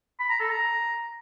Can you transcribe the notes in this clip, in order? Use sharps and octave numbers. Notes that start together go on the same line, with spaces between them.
B5
A#5
A4
A#5